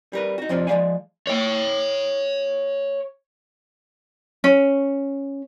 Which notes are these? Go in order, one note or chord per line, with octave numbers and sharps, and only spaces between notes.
G3 A#4 B4
D#4 F#4
F2 C3 F3 C4 D4
F3 G#3 D5 F5 G#5
C#5 G5
C#4